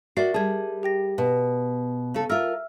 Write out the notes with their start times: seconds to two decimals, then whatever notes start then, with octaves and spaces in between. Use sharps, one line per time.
0.17 F#4 A#4 D5 E5 C7
0.34 G3 G#4 A5 G#6
0.83 G4 G5 A#6
1.18 B2
2.14 C#3 A4
2.30 F4 A#4 E5 E6 F6